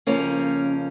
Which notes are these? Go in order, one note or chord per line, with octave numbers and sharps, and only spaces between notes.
F2 C#3 F3 A#3 C#4